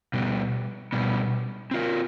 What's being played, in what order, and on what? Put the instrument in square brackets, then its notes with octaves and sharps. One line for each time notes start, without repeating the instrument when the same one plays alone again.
[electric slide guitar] B2 G3 B3
B2 G3 B3
C4 F4 A#4